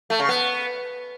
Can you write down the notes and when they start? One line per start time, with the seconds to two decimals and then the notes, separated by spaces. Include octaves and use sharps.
0.10 A3
0.19 C#3
0.29 B3